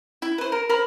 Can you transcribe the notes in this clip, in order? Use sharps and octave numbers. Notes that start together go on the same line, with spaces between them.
E4
B4 C5
A#4
A#4 C5 B5